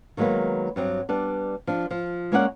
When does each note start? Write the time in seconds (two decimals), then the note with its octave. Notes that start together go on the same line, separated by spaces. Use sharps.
0.17 D#3 F#3 G#3 A#3 B3
0.76 G2 F#3 C4
1.09 G3 B3 D4
1.67 F3 D4
1.91 F3
2.32 G#3 A#3 C#4 C#5 D5 F#5